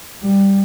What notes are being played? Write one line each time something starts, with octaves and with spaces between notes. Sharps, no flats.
G3